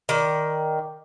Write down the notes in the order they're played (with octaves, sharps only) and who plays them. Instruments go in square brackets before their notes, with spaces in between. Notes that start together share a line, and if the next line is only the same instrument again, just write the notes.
[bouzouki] D#3 D5